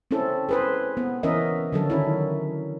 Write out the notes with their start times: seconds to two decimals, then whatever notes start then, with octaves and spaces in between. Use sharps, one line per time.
0.11 C4 C#4 E4 A4
0.49 G#4 B4 C5
0.97 B3
1.23 E3 C#4 A#4 D#5 E5
1.73 D3 F#3 A4
1.90 D#3 C#4 E4